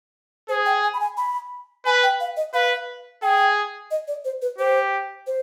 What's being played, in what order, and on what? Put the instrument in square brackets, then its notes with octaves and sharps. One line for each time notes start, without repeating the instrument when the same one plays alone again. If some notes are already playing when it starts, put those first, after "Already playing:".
[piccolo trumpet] G#4 [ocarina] C5
[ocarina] G5
G#5
B5
G#5
B5
[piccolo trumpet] B4 [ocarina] G#5
[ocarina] G5
F5
D#5
[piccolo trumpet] B4 [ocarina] F5
[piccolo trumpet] G#4 [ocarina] G5
[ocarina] D#5
D5
C5
B4
[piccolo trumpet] G4 [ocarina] C5
[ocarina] C5